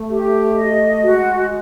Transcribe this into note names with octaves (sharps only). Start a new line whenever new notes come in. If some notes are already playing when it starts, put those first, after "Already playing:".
Already playing: A3
G4
D#5
G#3 F#4